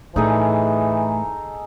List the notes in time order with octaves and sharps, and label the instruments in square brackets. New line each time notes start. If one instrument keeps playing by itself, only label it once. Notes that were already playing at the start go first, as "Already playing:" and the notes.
[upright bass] A2 [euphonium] E3 [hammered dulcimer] D#4 G#4 A4